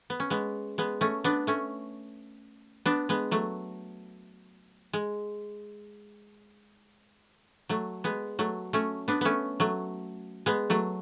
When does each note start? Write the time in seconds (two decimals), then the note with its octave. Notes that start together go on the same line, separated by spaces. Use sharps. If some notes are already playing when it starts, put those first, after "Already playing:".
0.10 B3
0.20 C#4
0.30 G#3 B3
0.78 G#3 B3
1.01 A3 C#4
1.24 B3 D4
1.47 A3 C#4
2.86 B3 D4
3.09 G#3 B3
3.31 F#3 A3
4.93 G#3
7.69 F#3 A3
8.04 G#3 B3
8.39 F#3 A3
8.73 A3 C#4
9.08 B3 D4
9.21 A3 B3 C#4
9.60 F#3 A3
10.46 G#3 B3
10.70 F#3 A3